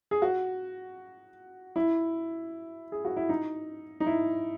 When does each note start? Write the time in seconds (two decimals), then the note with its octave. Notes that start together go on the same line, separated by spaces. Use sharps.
0.11 G#4
0.22 F#4
1.76 E4
2.92 G#4
3.05 F#4
3.16 E4
3.29 D#4
4.00 D#4
4.06 E4